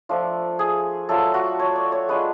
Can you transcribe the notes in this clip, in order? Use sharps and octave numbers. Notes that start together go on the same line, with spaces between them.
F3 A3 D4 F4
G#4
F#3 A3 D4 F4 A4
F#4
C#5
D5
C#5
G#3 D4 F4 B4